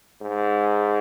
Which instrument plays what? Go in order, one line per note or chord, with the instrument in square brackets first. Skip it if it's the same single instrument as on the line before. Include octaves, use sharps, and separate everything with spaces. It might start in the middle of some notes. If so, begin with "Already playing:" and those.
[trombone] G#2